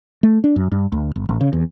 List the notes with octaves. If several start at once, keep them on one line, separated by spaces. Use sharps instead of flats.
A3
D4
F#2
G2
D2
G1
A1
C#3
E2